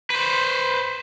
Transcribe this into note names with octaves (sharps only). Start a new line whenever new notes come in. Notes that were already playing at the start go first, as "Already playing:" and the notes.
B4 C5